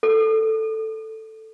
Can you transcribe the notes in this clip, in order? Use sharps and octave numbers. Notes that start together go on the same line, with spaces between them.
A4